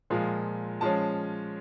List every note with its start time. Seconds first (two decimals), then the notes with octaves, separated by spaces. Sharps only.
0.10 A#2 F3 G#3
0.81 F3 G#3 C#4 A5